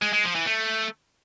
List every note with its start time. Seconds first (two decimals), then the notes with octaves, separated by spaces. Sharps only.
0.02 G#3
0.13 G#3
0.24 F3
0.35 E3
0.46 A3